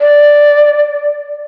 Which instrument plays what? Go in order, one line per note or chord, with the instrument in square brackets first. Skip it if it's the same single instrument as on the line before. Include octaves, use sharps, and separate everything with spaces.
[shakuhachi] D5